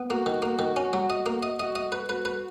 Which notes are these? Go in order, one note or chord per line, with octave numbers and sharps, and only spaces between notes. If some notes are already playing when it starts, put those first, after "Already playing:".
Already playing: B3
A#3 F#4
D#3
A#3
D#3
C#4
F#3
D#5
A#3
D#5
F#4 D#5
D#5
B4
F#4 B4
B4